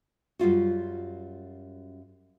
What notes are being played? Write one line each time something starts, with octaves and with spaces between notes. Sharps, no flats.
F#2 G3 F4 F#4